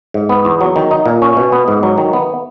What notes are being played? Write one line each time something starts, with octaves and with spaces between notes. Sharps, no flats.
G#2
B3
E2
F#3
D#3
D#4
A#2
C#4
B2
B3
G#2
F#3
D#3
B3